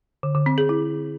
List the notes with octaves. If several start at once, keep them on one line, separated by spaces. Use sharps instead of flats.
D3
D3
C4
G#4
E4